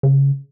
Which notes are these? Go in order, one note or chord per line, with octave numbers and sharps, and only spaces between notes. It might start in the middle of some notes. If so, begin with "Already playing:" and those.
C#3